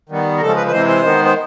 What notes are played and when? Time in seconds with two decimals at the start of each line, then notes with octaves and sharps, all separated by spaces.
0.09 D#3 G3 B3
0.37 A#4
0.41 C#3 F3 G#3 A4
0.57 B4
0.67 B4
0.72 C3 E3 G#3 C5
0.88 C5
1.03 D#3 G#3 B3
1.25 C5